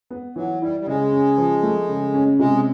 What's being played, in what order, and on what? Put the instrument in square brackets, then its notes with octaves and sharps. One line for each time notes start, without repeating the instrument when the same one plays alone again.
[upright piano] B3
[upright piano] E3 [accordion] F#3
[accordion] G3 [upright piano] E4
[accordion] G3
[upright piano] C#3 [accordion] G#3
[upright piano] C#4
F3
A3
C#3
C#4
[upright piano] C3 [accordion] G#3